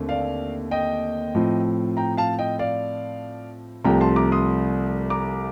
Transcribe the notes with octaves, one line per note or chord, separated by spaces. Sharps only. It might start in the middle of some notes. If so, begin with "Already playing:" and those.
Already playing: D#2 D3 A3 C4
D5 F5
D#5 G5
A2 F3 C4
G5 A#5
F5 A5
D#5 G5
D5 F5
C2 C3 F3 A3 C4 G5 A#5
A5 C6
A#5 D6
C6 D#6
A#5 D6